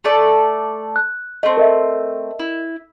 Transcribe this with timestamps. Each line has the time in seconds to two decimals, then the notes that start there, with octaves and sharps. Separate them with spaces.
0.04 A3 A4 D5
0.96 F#6
1.43 A3 C4 D#5
1.57 A#4 D#5 E5
2.39 E4